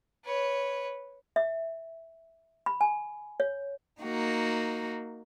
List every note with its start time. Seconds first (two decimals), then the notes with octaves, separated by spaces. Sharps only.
0.24 B4 C#5
1.36 E5
2.66 B5
2.81 G#5
3.40 C#5
4.02 A#3 D#4 F#4